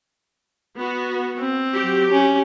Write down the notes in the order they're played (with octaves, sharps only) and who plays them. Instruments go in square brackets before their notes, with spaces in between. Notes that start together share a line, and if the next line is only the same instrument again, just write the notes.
[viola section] B3 F#4
[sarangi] C4
[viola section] F#3 G4
[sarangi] C#4